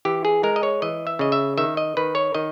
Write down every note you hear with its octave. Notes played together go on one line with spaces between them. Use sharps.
E3 G4
G#4
G#3 A#4
D#5
C#5
E3 D#5
E5
C#3 D#5
E5
D#3 E5
D#5
D#3 B4
C#5
D#3 D#5